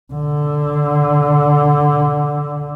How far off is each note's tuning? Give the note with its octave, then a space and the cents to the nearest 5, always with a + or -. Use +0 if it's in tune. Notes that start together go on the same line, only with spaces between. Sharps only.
D3 +0